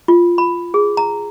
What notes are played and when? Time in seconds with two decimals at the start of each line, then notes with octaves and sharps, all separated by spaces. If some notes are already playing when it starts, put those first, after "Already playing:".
0.08 F4
0.38 B5
0.74 G#4
0.97 A#5